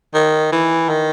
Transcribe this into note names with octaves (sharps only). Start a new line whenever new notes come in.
D#3
E3
D#3